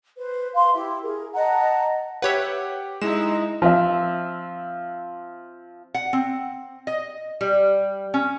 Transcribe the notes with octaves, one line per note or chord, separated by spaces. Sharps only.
B4 C5
F5 C6
E4 G4 E5
G#4 A#4
D#5 F#5 A5 A#5
G4 B4 C#5 E5 F#5
G#3 D#4 E4 E7
F3 C4 E5
F#5
C4
D#5
G3
C#4